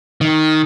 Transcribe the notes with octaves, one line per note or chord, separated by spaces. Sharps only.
D#3